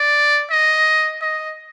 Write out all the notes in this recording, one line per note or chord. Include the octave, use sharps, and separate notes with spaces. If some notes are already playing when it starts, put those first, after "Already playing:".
Already playing: D5
D#5
D#5